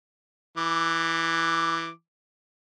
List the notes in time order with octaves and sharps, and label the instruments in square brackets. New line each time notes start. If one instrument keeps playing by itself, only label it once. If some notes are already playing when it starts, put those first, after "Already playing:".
[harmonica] E3 D6